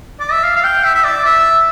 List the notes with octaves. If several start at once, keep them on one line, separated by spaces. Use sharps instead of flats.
D5
E5
F5
F5
G5
E5
E5
D5
E5